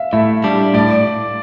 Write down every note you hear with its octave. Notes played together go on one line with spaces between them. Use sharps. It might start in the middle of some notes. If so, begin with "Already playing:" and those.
Already playing: E5 F5
A2 E5
G3 D4
A2 D5